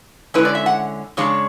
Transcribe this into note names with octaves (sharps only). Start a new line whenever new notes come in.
D3 G#3 C#4 E4 B4
D5
E5
F#5
C#3 G#3 D4 C#5